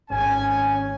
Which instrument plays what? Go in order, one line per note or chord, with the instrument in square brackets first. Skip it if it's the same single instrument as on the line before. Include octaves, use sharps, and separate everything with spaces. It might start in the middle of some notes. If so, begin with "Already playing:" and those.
[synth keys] G#1 [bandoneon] C#4 [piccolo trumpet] G#5